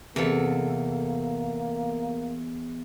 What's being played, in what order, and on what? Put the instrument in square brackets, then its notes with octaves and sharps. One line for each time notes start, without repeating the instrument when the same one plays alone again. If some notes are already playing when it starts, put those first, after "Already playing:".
[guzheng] E2 A4 [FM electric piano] C3 B3 [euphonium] A#3